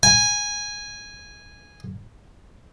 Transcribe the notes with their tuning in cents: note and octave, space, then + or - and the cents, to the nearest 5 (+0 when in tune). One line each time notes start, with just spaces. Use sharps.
G#5 -10